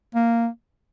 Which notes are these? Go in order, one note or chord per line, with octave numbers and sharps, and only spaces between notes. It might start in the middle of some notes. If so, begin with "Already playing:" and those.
A#3